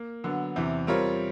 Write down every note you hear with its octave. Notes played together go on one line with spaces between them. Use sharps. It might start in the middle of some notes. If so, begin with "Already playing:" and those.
Already playing: A#3
D3 F#3 B3
E2 C3 E3
G3 C4 F4 A#4 C#5